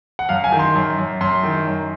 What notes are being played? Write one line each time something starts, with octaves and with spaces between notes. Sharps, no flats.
F#5
F#2 F5
G#5
D#3
C6
F#2
F#2
F#2 C6
D#3
F#2